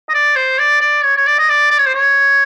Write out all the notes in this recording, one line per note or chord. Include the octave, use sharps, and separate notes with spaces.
D#5
D5
C5
D5
D5
C#5
C#5
D5
D#5
D5
D5
C#5
C5
C#5